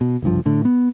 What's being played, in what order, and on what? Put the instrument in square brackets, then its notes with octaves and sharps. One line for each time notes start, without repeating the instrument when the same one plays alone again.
[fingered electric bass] B2
F#1 C2 G2 F3
A2 D3
B3